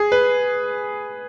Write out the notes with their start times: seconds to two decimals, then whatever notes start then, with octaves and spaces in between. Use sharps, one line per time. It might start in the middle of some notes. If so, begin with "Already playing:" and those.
Already playing: G#4
0.12 B4